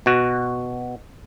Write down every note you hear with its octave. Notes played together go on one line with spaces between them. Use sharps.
B2 F#4